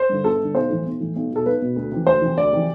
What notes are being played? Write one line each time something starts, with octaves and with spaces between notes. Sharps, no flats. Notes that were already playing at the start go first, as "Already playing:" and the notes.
Already playing: C5
G2 D3
G1 A4
G2 D3
B1 C5
A2 E3
B1
A2 E3
B1
B2
A4
B1 B4
B2
D2
C3 E3
D2 C5
C3 E3
D2 D5
C3 E3